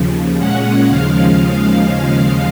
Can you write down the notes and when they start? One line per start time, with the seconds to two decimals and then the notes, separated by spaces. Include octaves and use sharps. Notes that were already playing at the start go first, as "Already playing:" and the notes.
Already playing: D#2 C#3 F3
0.38 A#2 G#3 C#4 F#5
0.87 D#2 C#3 F3 G#3 F5